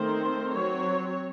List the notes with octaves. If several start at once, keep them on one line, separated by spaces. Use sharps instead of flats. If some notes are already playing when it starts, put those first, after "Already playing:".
Already playing: D#3 A3 C4 C5
F#3 C4 C#5